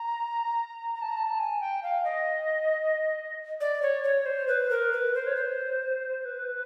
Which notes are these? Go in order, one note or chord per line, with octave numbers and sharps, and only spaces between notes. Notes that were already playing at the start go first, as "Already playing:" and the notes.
Already playing: A#5
A#5
A5
A#5
A5
G#5
G5
F5
D#5
D5
C#5
C#5
C5
B4
A#4
B4
C5
C#5
C5
B4